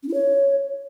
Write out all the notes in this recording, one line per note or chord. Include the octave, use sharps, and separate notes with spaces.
C#4
E4
C#5